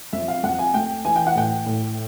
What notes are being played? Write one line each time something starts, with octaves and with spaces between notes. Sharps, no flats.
F2 E5
F5
F2 F#5
G#5
A3 G5
E3 G#5
G5
F#5
A2 G5
A2